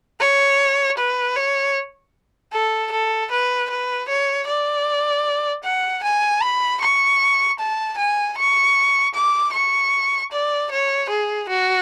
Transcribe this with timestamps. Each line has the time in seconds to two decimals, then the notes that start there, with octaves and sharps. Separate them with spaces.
0.20 C#5
0.98 B4
1.36 C#5
2.53 A4
2.92 A4
3.31 B4
3.70 B4
4.09 C#5
4.47 D5
5.64 F#5
6.04 G#5
6.42 B5
6.81 C#6
7.59 A5
7.98 G#5
8.38 C#6
9.14 D6
9.53 C#6
10.32 D5
10.71 C#5
11.10 G#4
11.49 F#4